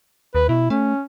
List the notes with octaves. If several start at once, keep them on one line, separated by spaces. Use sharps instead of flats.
D#2 B4
B2 E4
A3 C#4